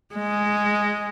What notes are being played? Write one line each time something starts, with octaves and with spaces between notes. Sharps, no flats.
G#3